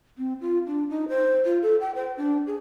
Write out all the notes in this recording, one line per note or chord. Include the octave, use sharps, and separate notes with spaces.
C4
F4
D4
D#4
C5
F4
A4
G5
C5
D4
G#4